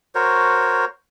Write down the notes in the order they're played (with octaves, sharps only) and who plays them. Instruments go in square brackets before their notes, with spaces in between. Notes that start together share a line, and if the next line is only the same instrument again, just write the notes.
[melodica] F#4 A#4 C5 C#5